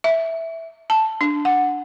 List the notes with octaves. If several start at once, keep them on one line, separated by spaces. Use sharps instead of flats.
E5
A5
D4
F#5